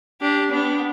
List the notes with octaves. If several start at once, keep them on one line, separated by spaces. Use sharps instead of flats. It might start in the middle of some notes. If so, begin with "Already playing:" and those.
D4 G4
B3 D4